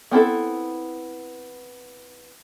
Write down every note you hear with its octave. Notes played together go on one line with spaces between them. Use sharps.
B3 C4 E4 A4